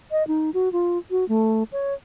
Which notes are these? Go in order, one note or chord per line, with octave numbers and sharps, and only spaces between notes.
D#5
D#4
F#4
F4
F#4
A3
C#5